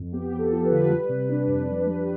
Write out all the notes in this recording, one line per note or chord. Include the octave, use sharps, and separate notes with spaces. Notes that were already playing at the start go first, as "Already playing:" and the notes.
Already playing: F2
B3 G4
F3
A4
F4
B4
D3
G3
C3
D4
F2
D4
G3